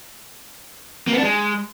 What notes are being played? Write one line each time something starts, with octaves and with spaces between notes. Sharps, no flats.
A#3
B3
D4
G#3